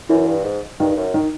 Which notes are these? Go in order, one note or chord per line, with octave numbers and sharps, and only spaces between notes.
F#2 E3
G2
G#2
G2 D#3
F#2
D#3